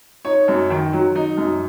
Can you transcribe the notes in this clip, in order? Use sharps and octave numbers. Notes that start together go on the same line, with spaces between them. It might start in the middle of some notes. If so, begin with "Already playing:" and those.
D#4 C#5
F#2
D#3
F#3
D#4
F#2